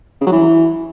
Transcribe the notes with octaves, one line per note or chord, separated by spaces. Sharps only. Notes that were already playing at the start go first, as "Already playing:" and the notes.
C#3
F#3
E3